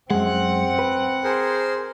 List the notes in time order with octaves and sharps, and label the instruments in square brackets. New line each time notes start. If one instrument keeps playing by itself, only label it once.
[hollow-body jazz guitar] F#2 G#3 [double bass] C4 [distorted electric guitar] F#5
[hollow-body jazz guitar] B4
[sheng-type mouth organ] G#4 A#4 C5